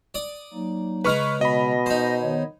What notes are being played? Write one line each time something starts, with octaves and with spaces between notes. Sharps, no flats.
D5 D#6
F#3 A#3 D#4
C#3 G#3 B4 A#5 C#6 F6
B2 D#5 B5 A#6
D#4 C5
D#3 B3 C#5